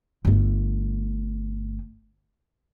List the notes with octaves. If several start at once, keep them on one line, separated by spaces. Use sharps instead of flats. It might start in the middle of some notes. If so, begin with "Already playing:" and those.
G1 A3